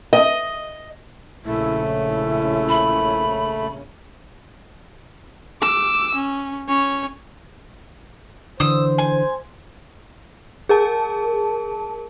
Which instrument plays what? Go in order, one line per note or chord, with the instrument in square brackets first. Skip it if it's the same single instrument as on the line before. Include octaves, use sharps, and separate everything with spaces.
[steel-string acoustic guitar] D#5
[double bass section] A#1 C#3 C#4 [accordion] A3 [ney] E4
[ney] E4
[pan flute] B5
[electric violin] D6 E6
C#4
C#4 C#5
[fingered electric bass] D3 E3 [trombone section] C5 [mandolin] D#6 E6
[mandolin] G#5
[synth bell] G#4 A#4 A5